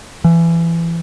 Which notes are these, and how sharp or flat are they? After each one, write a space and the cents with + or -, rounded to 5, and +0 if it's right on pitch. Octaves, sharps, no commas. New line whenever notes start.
E3 +25